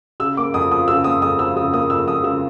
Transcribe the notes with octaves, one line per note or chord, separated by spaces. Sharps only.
C#3 E6
A#3 D6
F2 D#6
F3 D#6
C#3 E6
A#3 D#6
F2 D#6
F3 E6
C#3 D#6
A#3 D#6
F2 E6
F3 D#6
C#3 E6